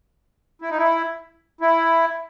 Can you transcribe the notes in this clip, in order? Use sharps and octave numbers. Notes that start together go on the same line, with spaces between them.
E4
D#4
E4
E4